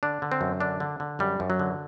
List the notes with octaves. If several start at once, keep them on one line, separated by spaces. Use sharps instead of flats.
D3 D4
D3
C4
F#2
D3 D4
D3
D3
F#2 G3
F#2
F#3
D3